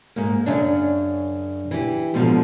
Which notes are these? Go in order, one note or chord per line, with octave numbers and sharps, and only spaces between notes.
G#2 A#3
F#2 C#3 D4
E3 G4
G#2 B2 D3 F3 G3